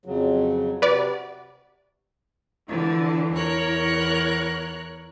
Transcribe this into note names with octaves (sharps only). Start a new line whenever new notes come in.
F2 C#3 F#3
C3 F#4 B4 D5
D3 E3 F3
E2 E4 A#4 C#5 F#6